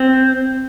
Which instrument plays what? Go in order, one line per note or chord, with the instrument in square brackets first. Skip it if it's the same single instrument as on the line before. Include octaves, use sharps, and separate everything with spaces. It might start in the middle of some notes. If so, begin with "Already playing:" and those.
Already playing: [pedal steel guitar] C4